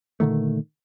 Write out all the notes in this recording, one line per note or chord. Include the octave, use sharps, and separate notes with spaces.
A#2 D3 D#3 A3